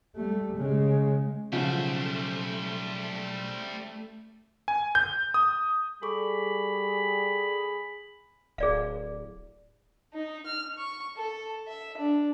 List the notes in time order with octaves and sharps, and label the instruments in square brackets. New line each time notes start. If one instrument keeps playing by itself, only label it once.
[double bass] G3 A3
C#3 G#3
[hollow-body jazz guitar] B1 D#4 F#5 [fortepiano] C#3 F3 [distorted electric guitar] G3 C5 [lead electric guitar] A3
[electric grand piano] G#5
G6
D#6
[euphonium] G3 [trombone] G#4 [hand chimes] A4 C#6 D6 [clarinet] B5
[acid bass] D1 [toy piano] G#4 D5 F5
[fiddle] D#4
F6
C#6
A4
E5
D4